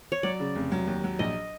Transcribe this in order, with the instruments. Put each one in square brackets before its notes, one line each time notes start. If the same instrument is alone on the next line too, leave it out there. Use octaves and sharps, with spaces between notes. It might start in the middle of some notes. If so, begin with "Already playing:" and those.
[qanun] C#5
[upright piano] F#3 [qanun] D5
[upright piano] C#3
F1
F#3
D#2
F#3
[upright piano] A#1 [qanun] D#5